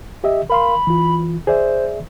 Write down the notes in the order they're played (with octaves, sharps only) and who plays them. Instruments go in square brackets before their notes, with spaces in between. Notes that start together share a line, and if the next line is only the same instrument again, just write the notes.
[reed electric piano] G4 D#5 E5
[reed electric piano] A#4 F5 C6 [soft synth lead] B5
[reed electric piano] E3 F4
[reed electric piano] G#4 D5 E5 [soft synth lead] C5